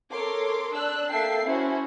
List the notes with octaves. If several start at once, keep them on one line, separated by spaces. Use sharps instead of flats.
A4 A#4 C#5 C6 D6
D4 E6 F#6
A#3 A4 E5 G5 A5 C7
C#4 E4 F#4 C5